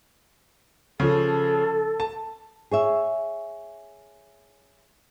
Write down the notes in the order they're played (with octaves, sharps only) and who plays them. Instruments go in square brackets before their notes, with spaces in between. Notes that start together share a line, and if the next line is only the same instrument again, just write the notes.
[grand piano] C#3 F3 [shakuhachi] A4
[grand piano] A5
[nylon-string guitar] G#4 C#5 E5